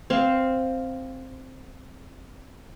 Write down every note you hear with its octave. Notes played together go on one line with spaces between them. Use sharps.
C4 F5